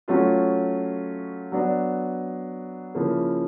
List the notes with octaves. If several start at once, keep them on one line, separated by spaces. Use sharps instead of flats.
F#3 A3 C#4 F4
F#3 B3 D4
C#3 F3 A#3 C#4 E4